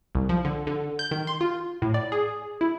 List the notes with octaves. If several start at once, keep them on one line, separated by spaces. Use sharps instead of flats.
C2
F3
D3
D3
G6
D#3
C6
F4
A2
D5
G#4
E4